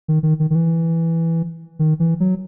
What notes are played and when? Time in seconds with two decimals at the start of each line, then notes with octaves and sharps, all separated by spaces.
0.08 D#3
0.23 D#3
0.40 D#3
0.50 D#3
0.55 E3
1.79 D#3
2.00 E3
2.20 F#3